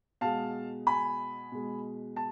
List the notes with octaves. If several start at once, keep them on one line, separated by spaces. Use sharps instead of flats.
B2 G#3 F5 A5
G#5 B5
B2 G#3
A5